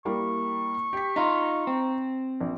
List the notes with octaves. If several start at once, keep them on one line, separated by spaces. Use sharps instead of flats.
G3 A#3 E4 C#6
G4 B6
D#4 F4 A#5
C4
A#1